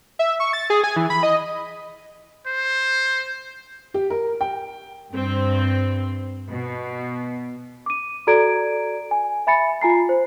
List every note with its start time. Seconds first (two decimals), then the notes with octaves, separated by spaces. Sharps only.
0.19 E5
0.40 C#6
0.53 A6
0.70 G#4
0.84 G#5
0.96 E3
1.10 B5
1.23 D#5
2.46 C5
3.94 G4
4.10 A#4
4.41 G5
5.12 G2 C4
6.50 B2
7.86 D6 D#7
8.27 F#4 A4 D5 A#5 G#6 D7
9.11 G#5
9.47 E5 G#5 B5 A6 C#7
9.82 F4 G#5 A#5 C7
10.09 C5